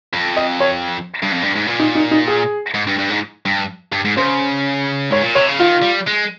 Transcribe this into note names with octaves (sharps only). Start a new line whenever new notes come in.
F2
D#5
C#5
G2
F2
G2
G#2
A#2
D#4
D#4
D#4
G#4
G#2
G2
G2
G#2
G2
G2
G#2
C#3 C5
G#2 C#5
A#2
C3 C#5
C#3
D#3 F4
G3
G#3